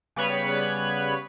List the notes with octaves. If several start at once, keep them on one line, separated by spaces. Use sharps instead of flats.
C#3 G3 B3 B4 C#5 B5